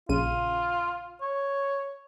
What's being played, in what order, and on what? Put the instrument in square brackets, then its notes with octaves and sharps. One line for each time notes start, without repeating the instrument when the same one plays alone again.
[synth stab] A#1 C#3 D#7 [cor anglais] F4
[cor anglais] C#5